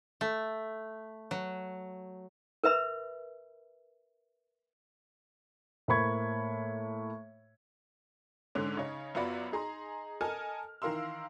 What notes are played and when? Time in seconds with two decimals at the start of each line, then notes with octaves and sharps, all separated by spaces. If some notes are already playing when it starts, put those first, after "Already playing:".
0.21 A3
1.31 F#3
2.64 A#4 B4 E5 B5
5.88 A2 A#3 C5 B5 C#6 G#6
8.55 G#2 D3 G#3 C#4
8.77 C#3 D#4 C#5
9.15 F#2 B3 F4 F#4 D5 B5
9.52 D#4 G#4 A#5 C6
10.21 A4 A#4 D#5 G#5 A5 F6
10.82 D#3 E3 A#4 F5 C6 E6